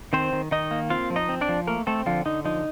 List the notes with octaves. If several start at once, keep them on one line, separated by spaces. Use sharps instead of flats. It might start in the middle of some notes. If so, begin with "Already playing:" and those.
D#3 C4 C5
D#3
D#3 D#4 D#5
A#3
C4 F4 F5
F3
D#4 D#5
C4
D4 D5
F3
A3 A#3 A#4
A3 C4 A4
D3 F3 F4
D3 D#4
F3 D#4